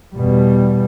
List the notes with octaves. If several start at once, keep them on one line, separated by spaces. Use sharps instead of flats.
E2 B2 G3